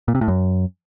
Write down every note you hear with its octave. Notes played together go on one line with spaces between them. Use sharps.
A#2
C3
A2
F#2